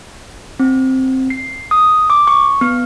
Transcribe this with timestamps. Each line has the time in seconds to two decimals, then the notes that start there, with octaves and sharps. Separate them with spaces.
0.60 C4
1.30 C7
1.71 D#6
2.10 D6
2.27 C#6
2.61 B3